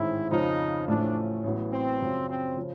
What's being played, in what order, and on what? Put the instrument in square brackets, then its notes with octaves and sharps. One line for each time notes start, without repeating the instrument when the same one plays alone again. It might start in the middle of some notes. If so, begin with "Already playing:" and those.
Already playing: [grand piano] A1 G#2 D#3 G#3 C4 [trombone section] E4
[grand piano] F2 C#3 F3 [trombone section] D#4
[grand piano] A1 A2 F3 A3 C#4 [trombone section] D4
[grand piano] A1 A2 F#3 B3
[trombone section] C4
[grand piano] F#2 C#3 F3
[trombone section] C4
[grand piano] C#3 F3